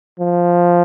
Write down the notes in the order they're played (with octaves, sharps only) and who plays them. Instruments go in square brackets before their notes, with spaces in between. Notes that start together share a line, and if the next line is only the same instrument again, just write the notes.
[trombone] F3